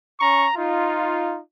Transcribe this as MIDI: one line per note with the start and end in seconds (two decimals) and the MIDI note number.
0.20 0.48 61
0.20 0.48 82
0.20 0.48 85
0.56 1.40 63
0.56 1.40 65